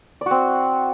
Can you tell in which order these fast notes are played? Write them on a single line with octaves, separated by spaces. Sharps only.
D5 F#4 C4